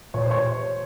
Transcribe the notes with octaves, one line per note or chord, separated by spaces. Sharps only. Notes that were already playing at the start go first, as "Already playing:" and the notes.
A#2 C#5
C5
C#5